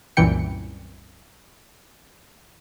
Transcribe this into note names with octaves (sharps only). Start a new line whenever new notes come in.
C2 F#2 A#2 E3 G5 C#7